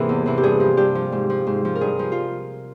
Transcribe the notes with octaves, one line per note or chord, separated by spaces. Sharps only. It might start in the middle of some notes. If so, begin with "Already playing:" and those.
Already playing: G#2 C3 E3 A#3 G#4 A#4
E2
C3 E3
G4
G2 G#4
F3
G2 G4
F3
G#2
F3
G#2
F3
A#4
G2 G#4
F3
F4